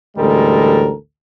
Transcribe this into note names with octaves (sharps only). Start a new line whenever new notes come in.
A1 D2 G3 G#3 A4 A#4